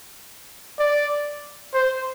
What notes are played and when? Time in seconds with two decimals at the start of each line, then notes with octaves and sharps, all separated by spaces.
0.79 D5
1.74 C5